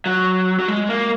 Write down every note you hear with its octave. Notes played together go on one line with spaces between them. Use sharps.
F#3
F#3
G#3
A#3